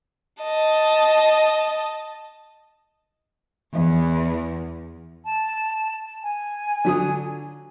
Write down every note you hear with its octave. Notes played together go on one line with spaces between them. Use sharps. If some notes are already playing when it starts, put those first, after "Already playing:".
D#5 A5
E2
A5
G#5
D3 F#3 D#6